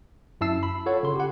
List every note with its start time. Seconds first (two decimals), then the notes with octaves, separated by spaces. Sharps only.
0.41 F#2 E4 E5 A5 E6 C7
0.63 B5
0.86 F4 A4 C#5 F#5
1.03 C#3 C6
1.15 G4 F#5